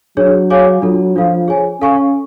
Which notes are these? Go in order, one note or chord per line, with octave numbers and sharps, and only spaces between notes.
F#3 D4 G#4 C#5
G#4 C#5 F5 G#5 D6
F#3 D4 F4 A4
F3 D4 F4 A4 F5
G#4 C#5 G#5
C#4 A4 F5 G#5 C#6